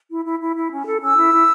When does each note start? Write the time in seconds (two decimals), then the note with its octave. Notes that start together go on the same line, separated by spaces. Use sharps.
0.09 E4
0.25 E4
0.40 E4
0.56 E4
0.71 C#4
0.86 A4
1.01 C#4 E6
1.17 E4
1.32 E4